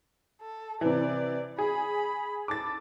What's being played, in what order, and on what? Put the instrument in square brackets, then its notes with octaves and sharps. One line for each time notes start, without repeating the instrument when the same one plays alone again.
[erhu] A4
[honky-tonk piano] C3 E3 [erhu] D5
[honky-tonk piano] G#4 [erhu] B5
[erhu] A4 [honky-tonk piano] D6 A6